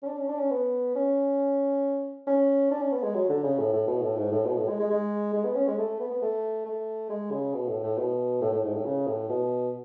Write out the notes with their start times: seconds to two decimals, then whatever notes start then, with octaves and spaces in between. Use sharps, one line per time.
0.03 C#4
0.07 D4
0.18 C#4
0.28 D4
0.39 C#4
0.51 B3
0.95 C#4
2.27 C#4
2.71 D4
2.82 C#4
2.92 B3
3.03 G#3
3.14 F#3
3.29 D3
3.43 C#3
3.59 A2
3.73 A2
3.87 B2
4.02 A2
4.17 G#2
4.32 A2
4.46 B2
4.57 A2
4.68 G#3
4.80 G#3
4.91 G#3
5.33 G#3
5.44 B3
5.56 C#4
5.67 G#3
5.78 A3
6.00 B3
6.11 B3
6.22 A3
6.65 A3
7.10 G#3
7.31 C#3
7.54 B2
7.68 A2
7.83 A2
7.98 B2
8.41 A2
8.53 A2
8.64 G#2
8.74 A2
8.85 C#3
9.07 A2
9.29 B2